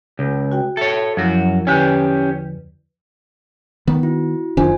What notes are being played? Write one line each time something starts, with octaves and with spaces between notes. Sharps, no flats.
C#2
F#4 G5
A4 C#5 E5
F#2 F3 E4 F#4
E2 D3 C#4 G4 B4
D#3 B3
E4 F#4
F#1 D#3 D4 F4 C5 G#5